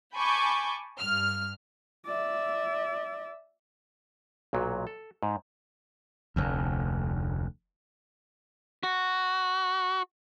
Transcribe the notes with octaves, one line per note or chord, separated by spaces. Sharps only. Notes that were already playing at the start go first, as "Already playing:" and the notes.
G#5 A5 B5 C#6 D6 G6
G2 F6
D5 E5
B1 A#2 F#3
A4
G#2
F1 D2
F#4